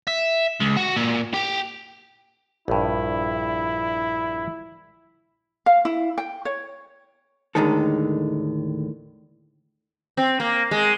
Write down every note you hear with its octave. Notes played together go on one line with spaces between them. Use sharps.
E5
C#2
F#4
A#2
G4
A#1 G2 E4
F5
E4
G5
C#5
D#2 A2 D3 D#3 G#3 A4
C4
A#3
G#3